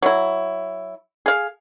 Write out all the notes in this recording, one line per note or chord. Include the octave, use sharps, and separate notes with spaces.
F#3 E4
G#4 F5